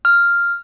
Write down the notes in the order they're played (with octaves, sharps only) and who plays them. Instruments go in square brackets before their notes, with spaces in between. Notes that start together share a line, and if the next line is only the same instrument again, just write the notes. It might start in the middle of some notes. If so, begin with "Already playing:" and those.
[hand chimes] F6